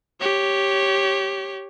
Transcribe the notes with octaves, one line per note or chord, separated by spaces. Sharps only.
G4 C#5